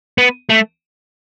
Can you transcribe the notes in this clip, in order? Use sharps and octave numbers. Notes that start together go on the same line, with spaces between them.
B3
A3